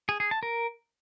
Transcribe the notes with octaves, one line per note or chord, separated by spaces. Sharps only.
G#4
G#4
A5
A#4